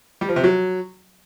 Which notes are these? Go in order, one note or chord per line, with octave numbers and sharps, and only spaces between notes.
G3
F3
C3
F#3